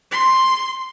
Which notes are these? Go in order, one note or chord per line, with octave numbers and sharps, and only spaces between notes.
C6